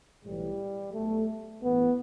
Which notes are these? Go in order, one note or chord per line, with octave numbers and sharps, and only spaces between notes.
B1 A2 E3 G3
B1 B2 A3
A1 G2 E3 B3